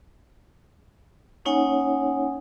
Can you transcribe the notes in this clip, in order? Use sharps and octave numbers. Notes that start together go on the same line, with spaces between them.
A#3 C#4 D#4 C#5 F#5 G#5